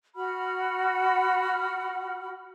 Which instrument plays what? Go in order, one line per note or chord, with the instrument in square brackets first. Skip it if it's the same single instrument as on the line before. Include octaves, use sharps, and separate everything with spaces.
[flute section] F#4 F#5 B5 F6